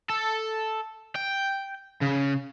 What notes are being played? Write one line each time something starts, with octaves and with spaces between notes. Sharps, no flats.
A4
G5
C#3